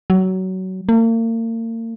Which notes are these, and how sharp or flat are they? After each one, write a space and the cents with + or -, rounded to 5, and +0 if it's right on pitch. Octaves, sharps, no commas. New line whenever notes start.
F#3 +20
A#3 -40